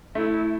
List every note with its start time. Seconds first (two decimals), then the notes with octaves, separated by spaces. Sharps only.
0.15 A3 E4